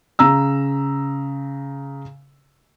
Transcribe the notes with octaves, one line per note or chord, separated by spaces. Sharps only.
C#3 A#5 E6